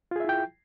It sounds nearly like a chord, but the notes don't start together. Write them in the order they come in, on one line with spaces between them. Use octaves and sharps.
F4 G#4 E5 E4 G5